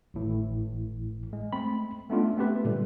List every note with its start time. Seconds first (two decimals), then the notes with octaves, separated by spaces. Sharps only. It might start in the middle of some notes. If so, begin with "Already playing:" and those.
0.14 G#1 A2 E3
1.33 G#3
1.53 A3 C4 B5
2.09 G#3 A3 B3 C#4 D4 F4
2.37 A3 B3 C4 G4 B4
2.65 A#2 D3 G3